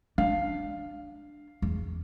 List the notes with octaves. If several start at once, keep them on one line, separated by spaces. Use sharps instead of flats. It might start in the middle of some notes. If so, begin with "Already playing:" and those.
D4 F5
E2